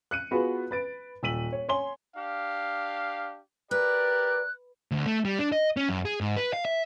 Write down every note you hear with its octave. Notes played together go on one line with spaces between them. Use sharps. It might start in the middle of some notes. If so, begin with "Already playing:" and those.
F#6 C#7 D#7
B3 F4 F#4 G#4 B4
B4 A6 D7
D#1 E6 B6 D#7 F#7
C#5
C#5 G#5 C6 G7
D4 G4 F5
G4 A#4 B4 D5 F#6
D2
A3
G3
D4
D#5
C#4
F#2
G#4
G#2
B4
F5
E5